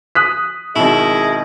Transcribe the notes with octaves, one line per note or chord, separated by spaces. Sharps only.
D#6 F#6 B6
G#1 B2 E4 G#4 D#5